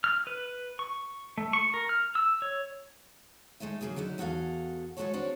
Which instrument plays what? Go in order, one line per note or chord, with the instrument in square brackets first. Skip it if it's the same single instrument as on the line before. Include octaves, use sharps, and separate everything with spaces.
[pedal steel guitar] F6
B4
C#6
A3
C#6
A#4
F6
E6
C#5
[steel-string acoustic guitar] G#3 A3 D#4 E5
C#3 E3 F#3 A#3 G#4
D3 F#3 D#4 E4
E2 F#4 G#4 A4 F5
G#3 A3 C4 F#4 A4 C#5
C4 D4 F#4 C#5